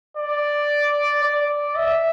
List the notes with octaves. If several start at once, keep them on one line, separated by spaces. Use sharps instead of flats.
D5
D5
E5